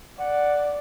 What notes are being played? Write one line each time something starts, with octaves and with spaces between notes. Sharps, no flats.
D5 F#5